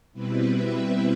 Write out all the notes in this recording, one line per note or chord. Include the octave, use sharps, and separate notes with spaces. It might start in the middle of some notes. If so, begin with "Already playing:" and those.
B2 G3 C4 E4 B4
E5